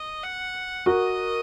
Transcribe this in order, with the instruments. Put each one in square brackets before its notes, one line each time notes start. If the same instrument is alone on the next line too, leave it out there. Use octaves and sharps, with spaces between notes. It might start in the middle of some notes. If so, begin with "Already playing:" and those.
Already playing: [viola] D#5
F#5
[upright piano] F#4 A#4 [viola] D#5